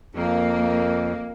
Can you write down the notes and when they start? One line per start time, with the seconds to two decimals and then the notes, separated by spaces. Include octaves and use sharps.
0.15 F2 A#3